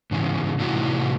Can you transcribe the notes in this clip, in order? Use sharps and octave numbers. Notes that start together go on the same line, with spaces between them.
G#2 C#3 E3
A2 C3 E3 D#4 E4 F#4